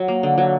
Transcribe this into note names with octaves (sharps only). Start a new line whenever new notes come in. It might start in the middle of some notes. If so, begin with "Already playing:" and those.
Already playing: F#3
A#3
D3
F#3